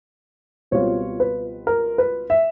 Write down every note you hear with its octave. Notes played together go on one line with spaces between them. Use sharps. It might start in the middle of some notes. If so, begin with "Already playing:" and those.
C#2 B2 G3 C4 F4 C#5
B4
A#4
B4
E5